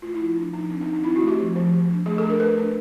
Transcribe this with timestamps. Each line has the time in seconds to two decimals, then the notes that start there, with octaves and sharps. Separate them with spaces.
0.02 A3 F4
0.14 E4
0.20 F3
0.36 F3 D4
0.53 F3 D#4
0.70 C4 D4
0.81 D#4
0.87 D#3
0.93 D#4
1.04 C4 E4
1.16 F#4
1.21 A3
1.28 G4
1.39 F3
1.56 F3
1.73 F3
1.89 D4
2.06 A3 G#4
2.18 A4
2.23 D4
2.30 A#4
2.40 A3 B4
2.57 D4